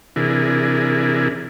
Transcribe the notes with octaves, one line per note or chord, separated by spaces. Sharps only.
C3 E3 D4 E4 G#4 A#4